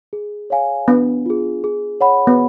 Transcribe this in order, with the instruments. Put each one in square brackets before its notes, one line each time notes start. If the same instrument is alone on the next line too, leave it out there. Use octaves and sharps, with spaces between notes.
[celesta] G#4
C#5 F5 G#5
[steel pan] B3 [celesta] D4
[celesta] F4 G#4
G#4
C#5 F#5 B5
[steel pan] B3